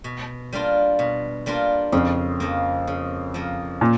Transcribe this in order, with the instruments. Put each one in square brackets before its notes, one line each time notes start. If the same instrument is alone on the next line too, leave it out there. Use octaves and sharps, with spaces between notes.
[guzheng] B2
G3 A#3 D4 F4
B2
G3 A#3 D4 F4
[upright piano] F2 [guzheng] C#3
[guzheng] F3 A#3
C#3
F3 A#3
[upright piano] A#2